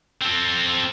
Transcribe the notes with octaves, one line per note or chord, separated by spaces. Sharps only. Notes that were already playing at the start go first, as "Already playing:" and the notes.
C4 A4